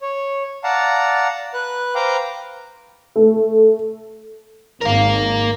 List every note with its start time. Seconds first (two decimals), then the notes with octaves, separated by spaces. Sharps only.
0.01 C#5
0.64 D5 F5 F#5 A5 A#5
1.54 B4 F#6
1.95 B4 C5 F5 G5 A#5 D6
3.16 A3
4.81 G#1 A#4 F5